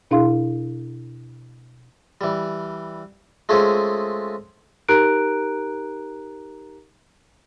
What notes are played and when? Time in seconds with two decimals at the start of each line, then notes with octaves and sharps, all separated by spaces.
0.11 B2 D4 E4 G#4 F5 C6
2.21 E3 G3
3.49 G#3 A3 C4 C#4 F4 G#4
4.88 D#4 G4 A#4 A#5 F#6 D7